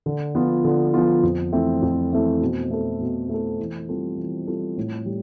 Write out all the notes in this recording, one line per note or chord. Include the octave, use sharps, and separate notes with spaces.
D3
F3 B3 F4
D3
F3 B3 F4
F2
E3 A3 C4 E4
F2
E3 A3 C4 E4
B2
A3 E4 A4
B2
A3 E4 A4
E3
G3 C4 F4 A4
E3
G3 C4 F4 A4
A2
G3